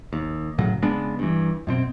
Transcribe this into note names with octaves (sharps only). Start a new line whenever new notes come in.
D#2
F#1 A2 C#3 F#3
C#3 G#3 B3 D4
G2 E3
F#2 B2 C4